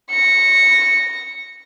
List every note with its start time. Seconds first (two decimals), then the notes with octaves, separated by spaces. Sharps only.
0.10 A#6 C#7